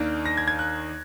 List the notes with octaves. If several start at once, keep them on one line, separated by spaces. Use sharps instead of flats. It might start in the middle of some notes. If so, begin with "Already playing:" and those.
Already playing: D#2 D#3 A#3 D4
A#6
G#6
G#6
F#6